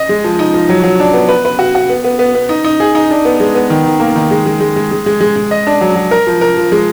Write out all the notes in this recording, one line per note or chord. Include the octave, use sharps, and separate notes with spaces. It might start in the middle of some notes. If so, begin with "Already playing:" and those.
Already playing: D#5
G#3
F3
D#4
F3
F#3
F#3
D4
B3
B4
B4
F#4
F#4
B3
B3
B3
B3
D#4
D#4
G#4
D#4
D4
B3
G#3
B3
D#3
D#3
A#3
D#3
G#3
G#3
G#3
G#3
G#3
G#3
G#3
G#3
D#5
D4
F#3
F#3
A#4
F3
A#4
F3
G#3